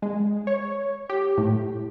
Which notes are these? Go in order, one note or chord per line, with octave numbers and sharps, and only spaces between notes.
G#3
C#5
G4
A2